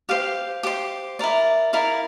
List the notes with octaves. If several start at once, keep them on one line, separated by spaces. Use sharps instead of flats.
G4 C5 F5
G4 C5
E4 A#4 D5
E4 A#4 D5 F5